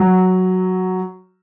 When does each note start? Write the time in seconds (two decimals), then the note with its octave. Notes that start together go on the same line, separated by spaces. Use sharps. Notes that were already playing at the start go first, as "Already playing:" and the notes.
Already playing: F#3